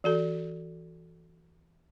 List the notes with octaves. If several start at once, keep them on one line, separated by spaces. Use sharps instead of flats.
E3 F#4 A4